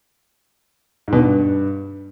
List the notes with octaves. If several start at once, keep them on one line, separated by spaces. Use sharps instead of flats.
G#2
B2
G2